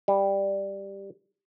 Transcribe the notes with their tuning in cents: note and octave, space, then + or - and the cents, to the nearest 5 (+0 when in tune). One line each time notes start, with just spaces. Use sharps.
G3 +5